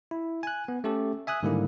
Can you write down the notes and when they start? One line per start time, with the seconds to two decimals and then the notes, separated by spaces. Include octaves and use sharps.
0.11 E4
0.43 G#5 F#6
0.68 B3
0.84 A3 C#4 G4 A4
1.27 E5 G#5 D#6 F#6
1.43 G#2 D3 D#3 G3 A#3 E4